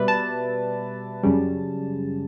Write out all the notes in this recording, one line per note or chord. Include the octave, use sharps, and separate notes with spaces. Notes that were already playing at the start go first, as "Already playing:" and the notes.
Already playing: B2 G3 B4 D5 E5
A5
F#2 C#3 G3